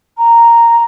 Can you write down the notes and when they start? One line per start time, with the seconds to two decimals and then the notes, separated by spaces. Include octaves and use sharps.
0.17 A#5